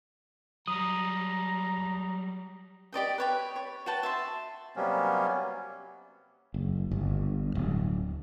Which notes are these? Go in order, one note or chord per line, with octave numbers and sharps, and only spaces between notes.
F#3 G3 A#5 D#6
G4 D5 D#5 G5
B4 C#5 G5
C#5
F#4 B4 G5 A5
E5 A5 C6
C3 F#3 G3 A#3 B3 C#4
F#1
G1
D1